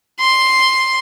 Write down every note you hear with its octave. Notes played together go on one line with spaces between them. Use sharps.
C6